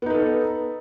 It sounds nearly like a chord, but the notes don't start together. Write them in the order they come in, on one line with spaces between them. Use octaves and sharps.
B3 D#4 B4 A4